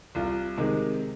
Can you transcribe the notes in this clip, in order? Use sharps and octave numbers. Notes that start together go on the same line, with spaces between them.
C2 F4
C3 D#3 G#3